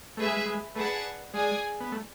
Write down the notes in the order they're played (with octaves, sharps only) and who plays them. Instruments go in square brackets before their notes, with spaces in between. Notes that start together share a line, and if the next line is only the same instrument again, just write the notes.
[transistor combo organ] A3 [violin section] G#4 B4 E5
[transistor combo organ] G#3
G#3
[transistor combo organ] A3 [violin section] G#4 B4 D5 F#5 A5
[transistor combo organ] G#3 [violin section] G#4 D5 G#5
[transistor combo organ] B3
A3